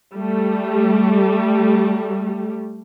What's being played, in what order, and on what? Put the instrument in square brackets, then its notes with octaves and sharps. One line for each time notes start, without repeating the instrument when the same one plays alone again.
[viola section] G3 A3